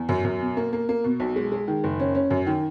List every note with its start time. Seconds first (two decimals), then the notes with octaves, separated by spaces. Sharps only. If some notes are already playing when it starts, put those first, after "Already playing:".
Already playing: E2
0.09 F#2
0.24 F#2
0.41 B2
0.57 A#3
0.73 A#3
0.89 A#3
1.04 B2
1.20 B1
1.36 G#3
1.52 G#3
1.68 D#3
1.84 F#1
2.00 C#4
2.15 C#4
2.30 F#2
2.47 D#3